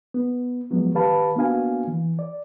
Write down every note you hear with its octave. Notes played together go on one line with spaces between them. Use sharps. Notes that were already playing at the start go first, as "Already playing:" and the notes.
B3
F3 F#3 G#3 B3
D#3 G4 B4 F5 A5 B5
A#3 B3 D4 F#4 F5 G#5
E3
D5